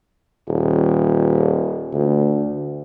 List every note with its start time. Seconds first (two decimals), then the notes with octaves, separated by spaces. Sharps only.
0.48 D#1
1.93 D2